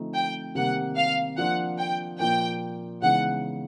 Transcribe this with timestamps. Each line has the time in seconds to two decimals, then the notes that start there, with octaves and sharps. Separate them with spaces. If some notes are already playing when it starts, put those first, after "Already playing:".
Already playing: D3 F3 A3 C4 D#4
0.14 G5
0.55 C3 D#3 G3 A#3 F#5
0.96 F5
1.37 F3 A#3 D4 F4 F#5
1.78 G5
2.20 A#2 F3 A#3 G5
3.02 C#3 E3 G#3 B3 D#4 F#5